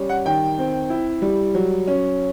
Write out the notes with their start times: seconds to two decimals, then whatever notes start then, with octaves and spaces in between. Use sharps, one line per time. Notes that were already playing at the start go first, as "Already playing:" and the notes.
Already playing: G3 C#4
0.09 F#5
0.25 D#3 G5
0.58 C4
0.90 E4
1.22 G3
1.54 F#3
1.87 C#4